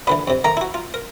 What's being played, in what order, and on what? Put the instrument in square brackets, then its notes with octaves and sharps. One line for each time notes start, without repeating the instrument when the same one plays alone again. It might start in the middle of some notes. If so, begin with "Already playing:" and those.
[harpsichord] A#2 D3 E3 [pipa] B4
[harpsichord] F2 C3
[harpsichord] D#3 A3 A#3 [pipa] A#5
[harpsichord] E4 F#4
F4
A#4